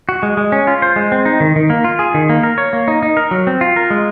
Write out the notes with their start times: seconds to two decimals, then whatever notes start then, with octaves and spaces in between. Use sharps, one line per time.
0.09 F#4
0.23 G#3
0.37 G#3
0.52 C#4
0.67 F4
0.82 C5
0.96 G#3
1.12 C4
1.25 D#4
1.40 D#3
1.56 D#3
1.70 A#3
1.84 F4
1.99 G#4
2.14 D#3
2.29 A#3
2.43 A#4
2.58 C#5
2.73 A#3
2.88 D#4
3.03 D#4
3.17 A#4
3.31 F#3
3.47 C4
3.61 F4
3.76 A#4
3.90 G#3